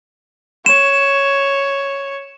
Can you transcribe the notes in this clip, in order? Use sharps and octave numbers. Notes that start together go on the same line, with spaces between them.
C#5 E7